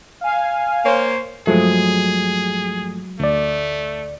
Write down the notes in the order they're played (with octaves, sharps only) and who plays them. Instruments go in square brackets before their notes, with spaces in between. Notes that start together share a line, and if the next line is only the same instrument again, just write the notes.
[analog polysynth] F5 G#5
[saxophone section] A#3 C5 C#5
[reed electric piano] G2 F3 A3 [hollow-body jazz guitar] F#3 G#3 [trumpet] G#4
[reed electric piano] D2 D5 [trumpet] A3